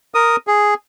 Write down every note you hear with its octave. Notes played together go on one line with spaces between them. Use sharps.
A#4 D#6
G#4